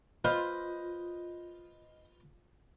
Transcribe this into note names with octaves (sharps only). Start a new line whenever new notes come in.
F4 B4 C5 D#5